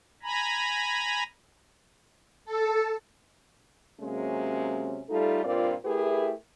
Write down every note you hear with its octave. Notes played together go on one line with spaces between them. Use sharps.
G#5 A#5 B5
A4
C3 F#3 G#3 A#3 C#4
G3 A3 D#4 F4 A4
G2 A#2 C4 F4 A#4 D5
A3 E4 G4 G#4 A#4 B4